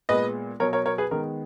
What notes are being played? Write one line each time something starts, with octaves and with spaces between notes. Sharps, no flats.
A#2 G#3 B3 B4 D#5
B2 F#3 B3 A#4 C#5
A#4 C#5
A#4 C#5
G#4 B4
D#3 G#3 B3 A#4